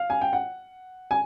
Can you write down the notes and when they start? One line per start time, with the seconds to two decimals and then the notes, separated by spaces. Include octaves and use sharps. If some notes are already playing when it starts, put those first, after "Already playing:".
Already playing: F5
0.10 G#5
0.21 G5
0.33 F#5
1.11 G#5